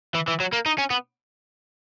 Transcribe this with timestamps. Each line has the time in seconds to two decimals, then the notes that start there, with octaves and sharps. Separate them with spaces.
0.15 E3
0.28 E3
0.40 F#3
0.53 A#3
0.66 D#4
0.78 C#4
0.91 B3